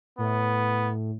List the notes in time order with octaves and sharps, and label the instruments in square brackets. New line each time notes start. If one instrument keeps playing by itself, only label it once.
[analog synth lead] A2 [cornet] B3